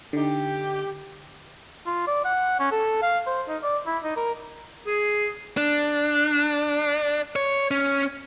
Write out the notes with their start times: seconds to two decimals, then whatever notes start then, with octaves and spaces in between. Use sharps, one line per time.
0.13 D3 D#4 G4
1.86 F4
2.07 D5
2.25 F#5
2.59 C#4
2.72 A4
3.02 F5
3.26 C5
3.48 D#4
3.63 D5
3.86 E4
4.03 D#4
4.16 A#4
4.87 G#4
5.57 D4
7.36 C#5
7.71 C#4